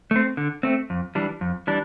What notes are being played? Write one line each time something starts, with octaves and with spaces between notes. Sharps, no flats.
A3 C4
D3
A3 C4
F2
E3 G3 D4
F2
E3 G3 D4